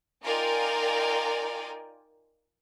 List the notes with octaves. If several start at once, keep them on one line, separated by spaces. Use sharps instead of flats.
D#4 F4 A#4 D5 G5 G#5